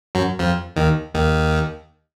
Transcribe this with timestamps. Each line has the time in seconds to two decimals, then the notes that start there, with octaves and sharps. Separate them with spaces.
0.15 F#2 F#3
0.39 F2 F3
0.76 D#2 D#3
1.14 D#2 D#3